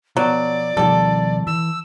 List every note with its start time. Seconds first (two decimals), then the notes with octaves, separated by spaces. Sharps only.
0.17 B2 F3 F#3 D5
0.77 B2 D#3 F3 G3 A4
1.47 E3 E6